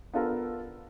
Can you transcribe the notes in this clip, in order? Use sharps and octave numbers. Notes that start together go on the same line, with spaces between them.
B3 D4 F4 A4 A#4